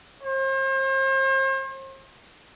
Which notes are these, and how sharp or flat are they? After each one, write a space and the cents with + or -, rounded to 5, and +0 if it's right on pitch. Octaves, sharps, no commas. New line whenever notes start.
C5 +40